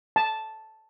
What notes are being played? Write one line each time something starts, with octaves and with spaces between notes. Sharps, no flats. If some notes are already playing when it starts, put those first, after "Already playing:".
A5